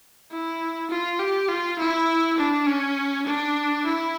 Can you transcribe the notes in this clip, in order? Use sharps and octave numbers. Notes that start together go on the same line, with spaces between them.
E4
F4
G4
F4
E4
D4
C#4
D4
E4